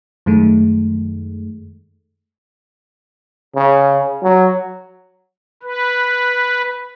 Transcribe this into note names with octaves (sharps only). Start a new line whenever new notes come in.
F#2 D#3 G#3 A3
C#3
F#3
B4